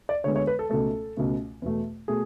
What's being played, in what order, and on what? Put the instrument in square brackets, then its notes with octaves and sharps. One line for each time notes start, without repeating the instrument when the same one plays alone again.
[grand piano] D5
D2 D3 G#3 B3 C#5
C#5
B4
A4
C#2 B2 A3 A4
C#2 B2 A3
E2 B2 A3
B2 A3 G#4